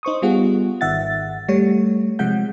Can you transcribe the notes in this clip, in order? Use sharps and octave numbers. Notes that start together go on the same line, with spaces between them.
D#4 C5 C#6 D#6
G3 B3 F4 G#4 F#5
G#1 D#3 E5 F#5 A6
G3 A3 C#5
C3 F3 G#3 F#5 G6